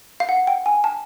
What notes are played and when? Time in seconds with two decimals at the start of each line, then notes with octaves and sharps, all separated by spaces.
0.20 F5
0.29 F#5
0.47 G5
0.66 G#5
0.84 A5